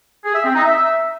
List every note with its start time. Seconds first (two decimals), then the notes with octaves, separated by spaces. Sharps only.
0.24 G#4
0.35 E5
0.45 C4
0.55 D#4
0.65 E5